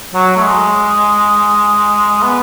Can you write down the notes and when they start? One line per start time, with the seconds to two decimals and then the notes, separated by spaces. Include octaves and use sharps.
0.14 F#3
0.37 A3
0.44 G#3
2.23 B3